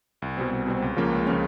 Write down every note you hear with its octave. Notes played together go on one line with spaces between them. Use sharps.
C2
B2 G3 C4
C2
B2 G3 C4
C#2
C#3 F3 A#3 C#4
C#2
C#3 F3 A#3 C#4